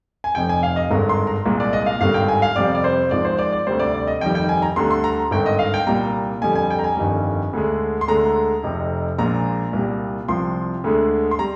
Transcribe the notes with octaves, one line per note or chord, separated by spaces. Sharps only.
G#5
F1 F2 C3 G5
G#5
F5
D#5
G#1 G2 D3 G#3 A#5
C6
A#5
C2 A#2 G#3
D5
D#5
F5
G#1 G2 D3 G3 F5
G5
G#5
F5
F2 C3 G3 D5
D5
C5
G#1 G#2 F3 G#3 D5
C5
D5
D5
D2 C3 G3 C5
D5
D5
D#5
F1 F2 D#3 G3 G5
G5
G#5
A#5
D2 D3 G3 C6
C6
A#5
G#1 G2 D3 G5
D#5
F5
G5
C2 A#2 G3 A#5
F2 D3 G3 G#5
G#5
G5
A#5
G#5
G1 F2 D#3 G3
D2 D3 G#3
C6
D2 D3 G#3 A#5
F1 F2 C3
A#1 A#2 G#3 A#5
C2 A#2 G3
C2 C3 F3 C6
D2 D3 G#3
C6
G3 A#5